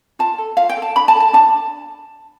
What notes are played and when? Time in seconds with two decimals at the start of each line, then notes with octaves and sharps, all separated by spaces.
0.19 F4 A5
0.38 A4
0.57 F4 F5
0.69 G5
0.77 A4
0.82 A5
0.96 D4 B5
1.08 A5
1.15 A4
1.20 A5
1.33 D4 A5